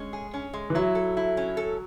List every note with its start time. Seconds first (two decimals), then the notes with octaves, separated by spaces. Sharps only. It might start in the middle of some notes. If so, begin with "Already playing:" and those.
Already playing: G#3 C#4
0.13 G#4
0.34 C#4
0.54 G#3
0.70 E3
0.75 F#3 E4
0.95 A4
1.17 E4
1.37 C#4
1.57 A4